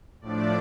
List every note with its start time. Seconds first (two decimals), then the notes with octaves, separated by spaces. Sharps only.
0.21 A2 F3 A3 D4 D5